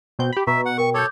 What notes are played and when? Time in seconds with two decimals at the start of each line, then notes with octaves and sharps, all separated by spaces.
0.19 B2 C4 G6
0.33 G4 B5
0.47 B2 B4 E5 A#5 C#6
0.66 F#5
0.78 A#4 G5 C#6
0.94 A4 C#5 D6 G6